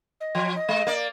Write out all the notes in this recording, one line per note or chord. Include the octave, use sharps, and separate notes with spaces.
D#5
F3
D#5
G#3
A#3 D5